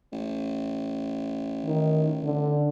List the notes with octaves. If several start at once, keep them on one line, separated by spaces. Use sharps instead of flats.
A1
D#3
D3